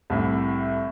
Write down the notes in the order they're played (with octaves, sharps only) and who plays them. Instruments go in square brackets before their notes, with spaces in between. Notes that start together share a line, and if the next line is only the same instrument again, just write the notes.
[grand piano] C2 A2 E5